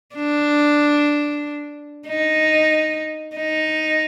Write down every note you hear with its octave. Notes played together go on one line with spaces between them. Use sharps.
D4
D#4
D#4